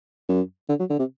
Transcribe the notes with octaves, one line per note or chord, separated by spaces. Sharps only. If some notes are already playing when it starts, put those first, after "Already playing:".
F#2
D3
F#3
D3
C3